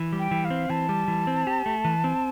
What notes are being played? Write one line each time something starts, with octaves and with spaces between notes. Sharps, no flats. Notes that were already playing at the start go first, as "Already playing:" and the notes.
Already playing: E3
G3
G5
E3
F5
C4
E3 A5
G3
E3
C4
G4
A3
E3
C4